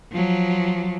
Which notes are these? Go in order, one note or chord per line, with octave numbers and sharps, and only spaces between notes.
F3 F#3